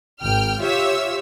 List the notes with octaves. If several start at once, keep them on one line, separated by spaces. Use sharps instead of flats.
G#1 G5 F6
F4 G4 C#5 E5 E6